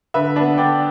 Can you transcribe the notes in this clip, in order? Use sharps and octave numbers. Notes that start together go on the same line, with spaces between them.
D3 B4 E5
B3 D4
D3 D5 G5